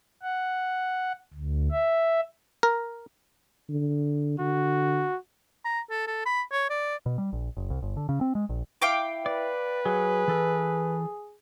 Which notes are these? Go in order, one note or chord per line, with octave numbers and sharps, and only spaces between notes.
F#5
D2
E5
A#4
D3
D3 F#4
A#5
A4
A4
B5
C#5
D5
B2
G3
A#1
F#1
C2
G1
D3
C#3
C4
G#3
A#1
E4 F5 G5 D6
B4 D5
F#3 G#4
E3 A4